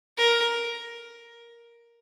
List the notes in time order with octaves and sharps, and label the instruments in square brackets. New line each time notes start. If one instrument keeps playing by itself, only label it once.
[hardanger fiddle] A#4